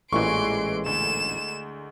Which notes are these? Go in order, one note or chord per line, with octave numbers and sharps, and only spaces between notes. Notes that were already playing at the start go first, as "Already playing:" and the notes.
A1 A#2 E3 G#3 E4 C6 C#6 D7
D2 E7